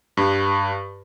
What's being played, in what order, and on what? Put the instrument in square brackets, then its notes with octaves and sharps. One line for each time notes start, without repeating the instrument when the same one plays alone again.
[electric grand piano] G2